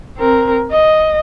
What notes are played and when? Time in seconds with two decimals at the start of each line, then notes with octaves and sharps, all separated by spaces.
0.18 C4 A#4
0.72 D#5